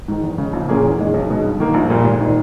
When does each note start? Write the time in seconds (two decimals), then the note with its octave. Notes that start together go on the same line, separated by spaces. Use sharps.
0.08 G#2 D#3
0.23 E2
0.38 C#3 G#3
0.53 A#1
0.69 A#2 A#3 C#4 G#4
0.84 E2
0.99 D#3 G#3
1.14 B1
1.30 B2 G#3
1.44 G2
1.60 D#3 A#3
1.74 A#1
1.90 A#2 G3 A#3
2.05 G#1
2.20 D#3